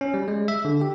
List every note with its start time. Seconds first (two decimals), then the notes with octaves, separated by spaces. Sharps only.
0.01 C#4
0.14 G3
0.28 G#3
0.48 E5
0.65 D3
0.81 G4